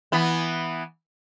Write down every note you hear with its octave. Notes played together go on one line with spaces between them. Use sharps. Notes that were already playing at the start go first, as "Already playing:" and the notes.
E3 B3